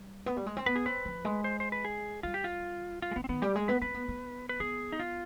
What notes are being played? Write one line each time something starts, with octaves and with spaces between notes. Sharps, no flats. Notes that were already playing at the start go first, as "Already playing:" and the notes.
Already playing: G3
B3
G3
G#3
C4
B3 B4
G#4
C4 B4
F3
G#3
C5
C5
B4
G#4
G3 F4
G4
F4
F4
G#3
D#3 B3
C4
D#3 B3
G3 G4
G#3 G#4
B3 B4
C4 B4
B3
B3
B4
B3 G#4
D#4
F4